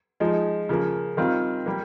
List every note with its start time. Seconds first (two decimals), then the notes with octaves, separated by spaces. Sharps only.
0.20 F3 G#3 D#4
0.69 C#3 F3 A#3
1.17 D#3 G3 C4 F4
1.66 G3 A#3